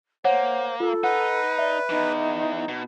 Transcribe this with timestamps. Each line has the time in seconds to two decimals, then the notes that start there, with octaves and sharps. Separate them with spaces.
0.25 A#3 C5 C#5 F#5
0.80 F4 A4
1.04 D#4 B4 F#5
1.59 D5 E5
1.90 E2 E3 D#4
2.69 B2